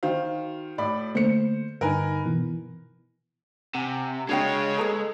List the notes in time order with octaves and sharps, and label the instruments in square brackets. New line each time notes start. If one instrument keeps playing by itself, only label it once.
[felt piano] D#3 C5 F5 [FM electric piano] F#4
[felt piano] A2 D5 B5
[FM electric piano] D3 A3 A#3 [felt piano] C5 C#7
[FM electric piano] G2 D3 D#4 [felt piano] A#4 B4 G#5
[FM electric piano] B2 E3 B3
[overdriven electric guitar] C3 [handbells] F#5 G#5
[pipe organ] C#3 C#5 [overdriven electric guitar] G#3 [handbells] D4 [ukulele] F#4 F5 G5
[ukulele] G#4 B4 A#5 [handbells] A4